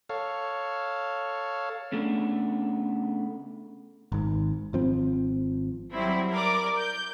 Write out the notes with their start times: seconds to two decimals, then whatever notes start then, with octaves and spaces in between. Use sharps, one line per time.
0.09 A4 C#5 F5
1.92 C#3 A3 B3 D4
4.12 G#1 G#2
4.73 G#1 F3 C4
5.93 F#3 G3 C4 E4
6.32 A#4 D5 D6
6.80 G6